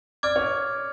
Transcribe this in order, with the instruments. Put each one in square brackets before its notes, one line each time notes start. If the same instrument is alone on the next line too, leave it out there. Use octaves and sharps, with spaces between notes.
[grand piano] D5 [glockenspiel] D6 F6 G#6
[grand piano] C#5